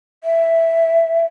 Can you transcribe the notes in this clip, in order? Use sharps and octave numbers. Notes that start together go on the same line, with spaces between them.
E5